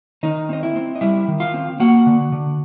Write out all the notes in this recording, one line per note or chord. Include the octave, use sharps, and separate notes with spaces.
D#3 D#4 D#5
C4 D#5
E4 E5
C4
D#5
G3 E4 E5
D#3
F4 F5
C4
A#3 F#4 F#5
D3
D3